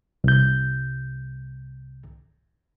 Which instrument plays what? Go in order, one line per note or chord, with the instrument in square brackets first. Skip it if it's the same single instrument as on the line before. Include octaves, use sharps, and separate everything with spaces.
[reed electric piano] C2 G6